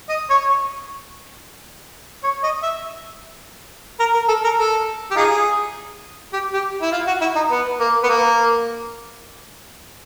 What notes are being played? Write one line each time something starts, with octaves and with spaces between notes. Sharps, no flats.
D#5
C#5
C#5
D#5
E5
A#4
A#4
A4
A#4
A4
G4
D#4 F4 G#4
G4
G4
E4
F4
F#4
E4
D#4
B3
A#3
B3
A#3